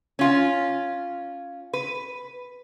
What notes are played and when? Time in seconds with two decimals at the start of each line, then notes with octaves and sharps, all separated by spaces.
0.19 C#4 F4
1.73 B4